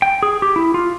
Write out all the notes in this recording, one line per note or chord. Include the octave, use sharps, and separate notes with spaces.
G5
G#4
G4
E4
F4